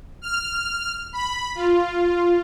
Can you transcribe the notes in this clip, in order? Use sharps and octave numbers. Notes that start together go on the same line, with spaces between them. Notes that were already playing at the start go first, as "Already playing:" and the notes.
F6
B5
F4